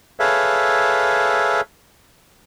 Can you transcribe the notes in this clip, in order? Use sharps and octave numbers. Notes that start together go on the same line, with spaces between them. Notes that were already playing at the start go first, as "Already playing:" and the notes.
G#4 A4 B4 C#5 E5 F5